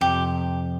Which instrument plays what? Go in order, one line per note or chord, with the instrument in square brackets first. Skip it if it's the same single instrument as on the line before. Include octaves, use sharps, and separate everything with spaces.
[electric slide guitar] F2 C3 F3 [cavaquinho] G4